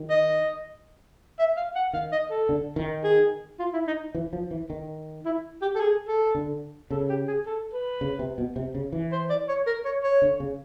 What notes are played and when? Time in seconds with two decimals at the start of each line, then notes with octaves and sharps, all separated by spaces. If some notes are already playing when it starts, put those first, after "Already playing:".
Already playing: D#3
0.10 D#5
1.39 E5
1.56 F5
1.75 F#5
1.93 D#3 F5
2.12 D#5
2.30 A4
2.49 D3
2.76 D#3
3.04 G#4
3.59 F4
3.73 E4
3.87 D#4
4.15 E3
4.33 F3
4.51 E3
4.70 D#3
5.25 E4
5.62 G4
5.75 A4
5.80 G#4
6.08 A4
6.35 D3
6.91 C#3 A4
7.09 G4
7.27 G#4
7.46 A4
7.73 B4
8.01 C#3
8.19 C3
8.38 B2
8.56 C3
8.75 C#3
8.93 E3
9.12 C5
9.29 D5
9.48 C#5
9.67 A#4
9.85 C#5
10.03 C#5
10.22 D3
10.40 C#3